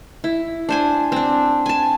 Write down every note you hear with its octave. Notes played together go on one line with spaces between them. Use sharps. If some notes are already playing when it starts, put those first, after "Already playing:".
E4
D4 C5 G#5
C4 D4
G#5 A5